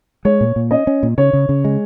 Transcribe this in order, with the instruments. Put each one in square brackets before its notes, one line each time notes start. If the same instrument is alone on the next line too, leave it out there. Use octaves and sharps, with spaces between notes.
[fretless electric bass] G#3 [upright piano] C#5
[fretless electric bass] A#2
A#2
[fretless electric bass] C#4 [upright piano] D#5
[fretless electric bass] C#4
A#2
[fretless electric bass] C#3 [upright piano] C#5
[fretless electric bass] C#3
C#3
G#3